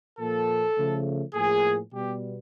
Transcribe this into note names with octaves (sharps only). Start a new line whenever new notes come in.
A#2 F3 A#3 A4
C#3 F3 A3
A2 F3 A#3 G#4
B2 G3 B3 G4